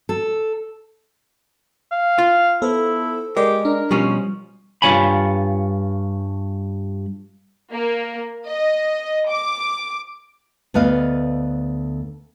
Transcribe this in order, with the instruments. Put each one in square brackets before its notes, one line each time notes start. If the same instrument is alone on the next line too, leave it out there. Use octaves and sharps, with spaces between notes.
[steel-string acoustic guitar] A4
[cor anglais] F5
[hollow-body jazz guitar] F4
[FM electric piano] B3 A4 C5 [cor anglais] E4
[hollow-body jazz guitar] G#3 [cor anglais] G4 [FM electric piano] A#4 D5
[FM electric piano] D4 [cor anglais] A#4
[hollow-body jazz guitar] B2 F3 C#4 [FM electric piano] G3
[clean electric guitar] G2 F4 C#5 G#5 B5
[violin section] A#3
D#5
D6
[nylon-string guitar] D2 A3 B3 B4 D#5 F5